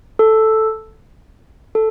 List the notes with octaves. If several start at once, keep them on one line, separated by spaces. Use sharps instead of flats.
A4
A4